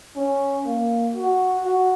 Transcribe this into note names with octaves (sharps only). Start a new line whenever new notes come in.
C#4
A#3
F#4
F#4